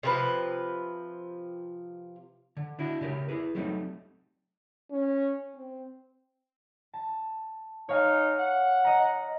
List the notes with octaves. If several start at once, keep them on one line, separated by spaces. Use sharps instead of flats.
C3 F3 B4
D3
D4 E4 F#4
C#3 G4 A#4
E4 G#4 B4
F#3 G3 A3 C4 C#4 D#4
C#4
C4
A5
D#4 C#5 F5 G#5
F#5
D#5 A#5